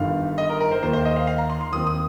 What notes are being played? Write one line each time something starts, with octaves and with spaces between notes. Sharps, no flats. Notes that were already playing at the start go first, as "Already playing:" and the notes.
Already playing: G1 G2 D#3 F5
D#5
A#4
A#4
C5
D#2 D#3 A#3 C5
C5
D#5
F5
F5
A#5
C6
C6
D#2 D#3 C4 D#6
D#6